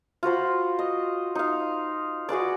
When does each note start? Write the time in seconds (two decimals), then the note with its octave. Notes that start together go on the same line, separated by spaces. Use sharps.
0.23 F4 F#4 C5 B5
0.79 D#5
1.35 D#4 F5
2.29 F#4 G#4 B4 D5